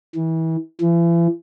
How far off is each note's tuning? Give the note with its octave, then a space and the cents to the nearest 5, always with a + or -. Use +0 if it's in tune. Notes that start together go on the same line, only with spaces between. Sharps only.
E3 -30
E3 +40